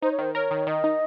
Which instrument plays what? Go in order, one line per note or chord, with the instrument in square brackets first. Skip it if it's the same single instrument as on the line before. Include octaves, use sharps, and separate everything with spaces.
[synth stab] D#4 [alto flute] C5
[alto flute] C#5
[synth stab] D#3 [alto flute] C5
[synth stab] A#4 [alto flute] C#5
[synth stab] D#3
[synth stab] D#3 [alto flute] D#5
[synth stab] D#4